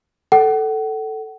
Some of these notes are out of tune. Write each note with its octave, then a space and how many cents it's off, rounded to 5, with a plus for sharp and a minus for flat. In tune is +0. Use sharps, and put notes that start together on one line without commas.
A4 +0 F#5 +35